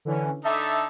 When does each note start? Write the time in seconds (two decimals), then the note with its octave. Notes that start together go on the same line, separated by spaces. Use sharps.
0.05 D3 E3 C#4
0.45 D3 D#4 A4 E5